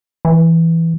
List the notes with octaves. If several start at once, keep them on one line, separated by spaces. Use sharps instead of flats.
E3